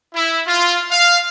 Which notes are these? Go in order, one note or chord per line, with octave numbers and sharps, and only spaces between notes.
E4
F4
F5